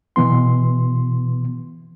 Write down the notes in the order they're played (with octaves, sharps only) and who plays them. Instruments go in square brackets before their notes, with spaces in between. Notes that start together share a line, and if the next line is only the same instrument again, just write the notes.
[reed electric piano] B2 E3 B3 C6